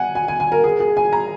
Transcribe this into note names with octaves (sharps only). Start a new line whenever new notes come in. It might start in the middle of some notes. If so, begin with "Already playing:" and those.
Already playing: F#5 G#5
G#5
G#5
G#5
A#4
G#4
G#4
G#5
A#5